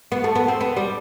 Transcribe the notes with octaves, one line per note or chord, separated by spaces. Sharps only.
B3
A3
B3
C4
B3
G3